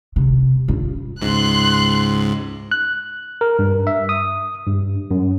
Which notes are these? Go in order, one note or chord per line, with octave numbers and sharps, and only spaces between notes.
C3
F4
C#2 G#2 C6 F#6
F#6
A#4
G2
E5
D#6
G2
F#2